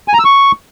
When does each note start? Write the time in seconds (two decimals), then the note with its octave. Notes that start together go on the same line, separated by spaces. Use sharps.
0.08 G#5
0.14 A#5
0.19 E6
0.25 C#6